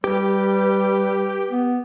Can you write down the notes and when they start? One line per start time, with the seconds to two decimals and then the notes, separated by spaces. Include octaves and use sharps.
0.04 G3 G4 B4
1.50 B3